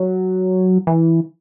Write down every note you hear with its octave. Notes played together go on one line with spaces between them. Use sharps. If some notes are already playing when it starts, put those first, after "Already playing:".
Already playing: F#3
E3